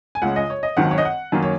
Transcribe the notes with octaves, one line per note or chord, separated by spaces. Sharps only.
G#5
C#2 C#3 G#3 F#5
D#5
C#5
D#5
G#1 F#2 D#3 F#5
C#5
D#5
F#5
F#2 D#3 A#3
C#5